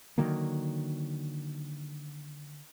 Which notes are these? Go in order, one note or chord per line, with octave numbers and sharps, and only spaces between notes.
D3 D#3 F#3 A#3